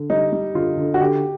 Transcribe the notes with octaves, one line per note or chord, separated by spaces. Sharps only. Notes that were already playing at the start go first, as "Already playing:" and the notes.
Already playing: D3
G3 D#4
G3
D3 F4
D3
F#4
D3 G4